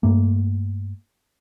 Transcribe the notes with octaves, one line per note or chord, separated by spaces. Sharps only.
G2 A3 A#3